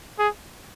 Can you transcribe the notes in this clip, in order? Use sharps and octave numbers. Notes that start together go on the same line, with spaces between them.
G#4